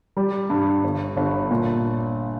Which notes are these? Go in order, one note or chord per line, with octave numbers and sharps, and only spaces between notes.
G3
G2
G1
G1
A#2